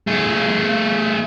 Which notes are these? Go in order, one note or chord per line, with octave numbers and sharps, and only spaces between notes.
A3 G#4